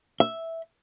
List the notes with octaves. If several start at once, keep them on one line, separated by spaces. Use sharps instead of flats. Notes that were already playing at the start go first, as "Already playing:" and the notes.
E5